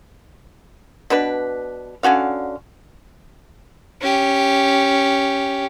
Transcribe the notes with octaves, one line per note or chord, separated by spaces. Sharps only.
B2 D4 B4
D3 C#4 F#4 F5
C#4 G4